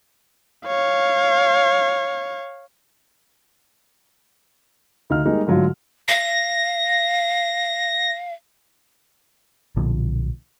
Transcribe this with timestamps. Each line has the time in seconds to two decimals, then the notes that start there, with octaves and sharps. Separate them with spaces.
0.67 C#5 F5
5.10 D2 D#4 F5 F6
5.26 G3 G#3 A#3 D#4
5.47 G#2 D3 F#3 A3 F4
6.08 F5 A#6
9.76 B1 A#2 D3 F3